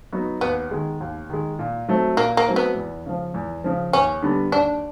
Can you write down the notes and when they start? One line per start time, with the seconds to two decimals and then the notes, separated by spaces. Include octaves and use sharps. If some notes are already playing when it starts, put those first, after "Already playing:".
0.12 F#3 B3 D#4 F#4
0.41 D#2 B3
0.71 D#3 G#3
1.00 D#2
1.30 D#3 G#3
1.59 A#2
1.88 F#3 A3 C4
2.17 A#2 A#3
2.37 A#3
2.47 F#3 A3 C4
2.56 B3
2.76 E2
3.06 C#3 F3
3.34 E2
3.64 C#3 F3
3.93 D#2 C#4
4.22 D3 G3 B3
4.52 D#2 D4